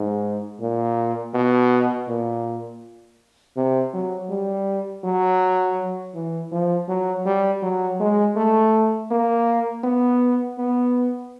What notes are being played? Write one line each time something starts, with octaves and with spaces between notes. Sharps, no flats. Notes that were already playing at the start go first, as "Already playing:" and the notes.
Already playing: G#2
A#2
B2
A#2
C3
F#3
G3
F#3
E3
F3
F#3
G3
F#3
G#3
A3
A#3
B3
B3